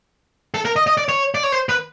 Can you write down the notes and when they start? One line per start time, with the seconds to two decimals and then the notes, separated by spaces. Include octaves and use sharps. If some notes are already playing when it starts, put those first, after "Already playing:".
0.54 A4
0.65 A#4
0.76 D#5
0.87 D#5
0.98 D5
1.09 C#5
1.35 D5
1.43 C#5
1.52 C5
1.69 B4